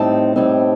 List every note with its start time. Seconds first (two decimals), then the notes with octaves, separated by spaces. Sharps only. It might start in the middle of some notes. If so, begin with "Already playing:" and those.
Already playing: A2 G3 C4 D#4 A5
0.36 A2 G3 C4 D#4